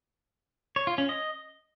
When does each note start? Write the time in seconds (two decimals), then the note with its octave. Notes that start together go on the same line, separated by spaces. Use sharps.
0.76 C#5
0.87 F4
0.98 C#4
1.09 D#5